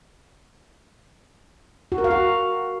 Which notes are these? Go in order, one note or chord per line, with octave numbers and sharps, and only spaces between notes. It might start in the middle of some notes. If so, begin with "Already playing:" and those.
F#4
A#4
F5
F#4